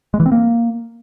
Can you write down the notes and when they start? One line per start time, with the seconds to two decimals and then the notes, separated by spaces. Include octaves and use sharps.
0.14 G#3
0.20 E3
0.26 C4
0.32 A#3